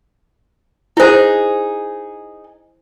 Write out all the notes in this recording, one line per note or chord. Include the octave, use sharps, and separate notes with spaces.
D#4 E4 G#4 C5